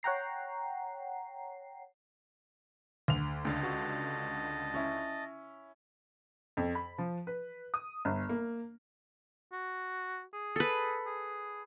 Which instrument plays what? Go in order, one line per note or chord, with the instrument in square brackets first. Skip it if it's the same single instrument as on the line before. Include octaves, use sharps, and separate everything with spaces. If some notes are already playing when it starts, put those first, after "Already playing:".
[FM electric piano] C#5 F#5 G5 A#5 C7
[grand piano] D2 F7
[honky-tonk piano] C#2 D3 [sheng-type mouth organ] D#5 A5
[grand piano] F#4
C#4 E4
[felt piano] F2
B5
F3
B4
D#6
G1
A#3
[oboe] F#4
G#4
[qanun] A4 B4
[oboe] G#4